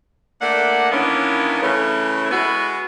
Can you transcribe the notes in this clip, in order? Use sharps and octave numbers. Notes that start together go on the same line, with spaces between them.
A3 A#3 D4 F#5
D#3 E3 A#3 B3 C#4 D4
C#3 E3 A3 C#4
G#3 B3 E4 F#4